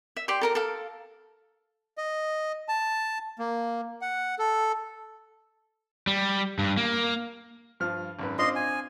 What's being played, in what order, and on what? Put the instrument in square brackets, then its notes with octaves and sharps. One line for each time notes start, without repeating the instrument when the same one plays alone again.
[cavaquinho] E5
G4 D5 G5 C6
A4 A#4 A#5
A4 F5
[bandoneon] D#5
A5
A#3
F#5
A4
[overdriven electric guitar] G3
G2
A#3
[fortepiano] G2 F3 F6
G#1 F#2 B4
[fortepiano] C4 D4 F4 [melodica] D#5 C6
[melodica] G#5